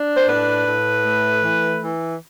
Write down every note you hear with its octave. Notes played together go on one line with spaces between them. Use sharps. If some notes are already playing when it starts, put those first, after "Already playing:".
Already playing: D4
C5
A2 B4
A2
A3
E3
E3